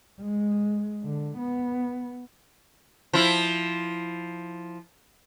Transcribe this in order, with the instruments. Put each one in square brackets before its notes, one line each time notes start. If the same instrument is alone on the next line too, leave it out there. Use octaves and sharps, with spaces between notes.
[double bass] G#3
D3
B3
[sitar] F3 E4